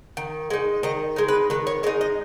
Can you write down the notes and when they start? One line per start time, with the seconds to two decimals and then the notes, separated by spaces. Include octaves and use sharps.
0.17 D#3
0.50 G#3 D#4
0.83 D#3 D#5
1.16 G#3 D#4
1.28 B4
1.50 D#3 B4
1.67 C#5
1.83 G#3 D#5
1.87 D#4
2.01 D#5